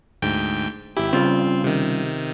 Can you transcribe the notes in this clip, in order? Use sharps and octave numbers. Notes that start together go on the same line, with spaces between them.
D2 G#2 G5
G#1 E4 G4
C#3 G3 C4 F4
C3 D#3